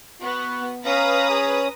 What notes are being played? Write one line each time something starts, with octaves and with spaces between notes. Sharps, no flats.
B3 F#4
C#4 B4 F5 A#5 D#6
G#4